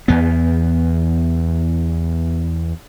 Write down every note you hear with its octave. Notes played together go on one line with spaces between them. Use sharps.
E2 B3